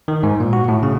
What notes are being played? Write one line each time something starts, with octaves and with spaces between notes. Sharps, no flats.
D#3
G#2
A#2
F#4
A2
C#3